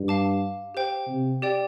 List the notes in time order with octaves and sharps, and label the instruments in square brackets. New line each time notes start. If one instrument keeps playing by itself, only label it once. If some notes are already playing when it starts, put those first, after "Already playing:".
Already playing: [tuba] G2
[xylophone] F5 A5 D6
G4 C5 G5
[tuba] C3
[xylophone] G4 D5 G5